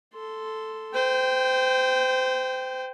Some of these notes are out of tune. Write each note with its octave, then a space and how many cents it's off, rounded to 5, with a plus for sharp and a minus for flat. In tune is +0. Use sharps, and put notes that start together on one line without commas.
A4 +0 C6 -10
C5 -25 G5 +0